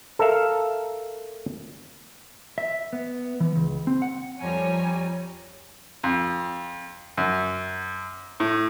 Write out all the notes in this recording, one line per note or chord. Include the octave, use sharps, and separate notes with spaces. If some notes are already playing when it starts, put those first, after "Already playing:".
A4 A#4 E5 F5
E5
B3
E3
C#2
C4
F#5
F2 F3 G3 C#5 G#5 A#5
F2
F#2
A2